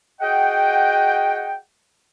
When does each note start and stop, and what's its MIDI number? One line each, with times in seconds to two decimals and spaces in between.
0.21 1.56 66
0.21 1.56 68
0.21 1.56 75
0.21 1.56 78
0.21 1.56 79